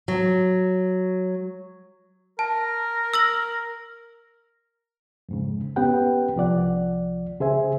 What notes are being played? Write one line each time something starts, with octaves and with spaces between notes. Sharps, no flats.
F#3
A#4 A5
E6 A#6 F#7
F2 G#2 C#3
B3 C#4 G4 B4 F#5 G5
C2 F3 D5 F#5
C#3 G#4 C5 E5 G#5